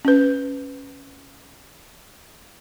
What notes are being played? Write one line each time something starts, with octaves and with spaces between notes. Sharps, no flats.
C#4 B4